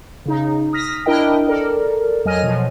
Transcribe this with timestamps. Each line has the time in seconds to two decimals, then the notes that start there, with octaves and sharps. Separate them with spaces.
0.26 C#3 D#4
0.73 D#6 F6 A#6 B6
1.06 D4 E4 A#4 D#5 G5
1.48 A4 A#4 D5
2.25 F2 F#3 D#5 G#5 F6 D#7
2.43 B2 F3 F#3